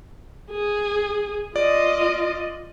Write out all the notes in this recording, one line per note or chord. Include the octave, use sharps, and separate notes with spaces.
G#4
F4 D5 D#5